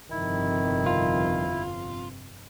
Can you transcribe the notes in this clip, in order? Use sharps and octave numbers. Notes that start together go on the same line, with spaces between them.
G1 F2 C3 D#3 E4
F4